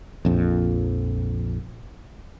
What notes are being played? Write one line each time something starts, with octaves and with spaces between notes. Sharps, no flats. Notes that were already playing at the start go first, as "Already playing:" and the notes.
A#1 F2